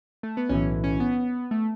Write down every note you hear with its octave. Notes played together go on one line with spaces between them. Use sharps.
A3
B3
B1 A2 E3 C#4
C#4
B3
A3